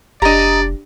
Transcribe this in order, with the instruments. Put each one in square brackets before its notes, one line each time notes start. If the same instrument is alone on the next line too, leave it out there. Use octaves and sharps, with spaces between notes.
[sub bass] F1 [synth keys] D4 G4 [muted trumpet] D5 [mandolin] D#5 A#5